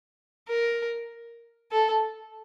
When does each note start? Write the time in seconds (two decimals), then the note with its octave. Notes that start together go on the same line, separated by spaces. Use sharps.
0.48 A#4
1.72 A4